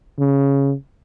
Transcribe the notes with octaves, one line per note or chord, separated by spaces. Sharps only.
C#3